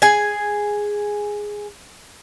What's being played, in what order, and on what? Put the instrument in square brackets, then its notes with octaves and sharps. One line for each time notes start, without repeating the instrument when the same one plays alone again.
[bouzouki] G#4 G#5